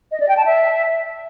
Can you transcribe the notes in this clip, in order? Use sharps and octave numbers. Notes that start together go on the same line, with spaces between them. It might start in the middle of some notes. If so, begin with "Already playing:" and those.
D#5
D5
G5
A5
E5